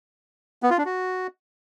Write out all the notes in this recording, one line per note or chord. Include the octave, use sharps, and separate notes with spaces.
B3
F4
D4
F#4